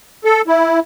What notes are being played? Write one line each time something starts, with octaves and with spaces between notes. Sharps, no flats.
A4
E4